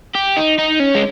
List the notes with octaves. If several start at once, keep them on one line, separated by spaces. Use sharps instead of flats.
G4
D#4
D#4
C#4
G#3